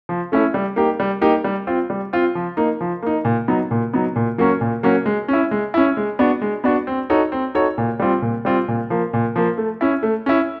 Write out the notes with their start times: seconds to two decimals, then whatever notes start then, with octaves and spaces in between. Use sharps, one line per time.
0.09 F3
0.32 A3 C#4 E4
0.54 G3
0.76 A#3 D#4 G4
1.00 G3
1.21 A#3 D#4 G4
1.44 G3
1.67 C4 F4
1.90 G3
2.13 C4 F4
2.35 F3
2.57 A#3 D#4
2.81 F3
3.03 A#3 D#4
3.25 A#2
3.48 F#3 B3 D#4
3.71 A#2
3.93 F#3 B3 D#4
4.16 A#2
4.38 F#3 A#3 C#4 F#4
4.61 A#2
4.83 F#3 A#3 C#4 F#4
5.06 G#3
5.28 C#4 E4
5.51 G#3
5.74 C#4 E4
5.97 G#3
6.19 B3 D4 F#4
6.42 G#3
6.64 B3 D4 F#4
6.87 C4
7.10 D#4 F#4 A4 C#5
7.32 C4
7.55 D#4 F#4 A4 C#5
7.78 A#2
8.00 G3 C4 F4
8.22 A#2
8.45 G3 C4 F4
8.68 A#2
8.90 F3 A#3
9.13 A#2
9.36 F3 A#3
9.58 A3
9.81 C#4 E4
10.03 A3
10.26 C#4 E4